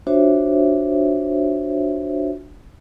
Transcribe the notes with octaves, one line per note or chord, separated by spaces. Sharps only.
D4 F4 F#4 C5 C#5 E5